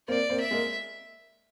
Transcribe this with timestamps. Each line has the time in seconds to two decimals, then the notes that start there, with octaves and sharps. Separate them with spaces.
0.08 A#3 C4 D5
0.30 A#3 C4
0.40 E5
0.51 G#3 A#3